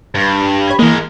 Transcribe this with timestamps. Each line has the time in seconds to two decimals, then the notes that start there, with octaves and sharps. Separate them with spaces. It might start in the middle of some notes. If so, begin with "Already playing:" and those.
0.15 G2
0.67 C#5 B5 G#6
0.79 E3 G#3 A#3 A#4